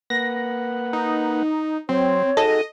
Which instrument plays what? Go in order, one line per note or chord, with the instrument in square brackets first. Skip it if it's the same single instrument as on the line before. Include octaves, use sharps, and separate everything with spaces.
[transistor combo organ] A#3 B4 F#5 [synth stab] A#6
[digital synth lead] D#4
[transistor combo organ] F#3 C6 [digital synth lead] C4 [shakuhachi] C#5
[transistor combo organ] D#4 F#4 G#4 [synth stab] A4 [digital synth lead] D#5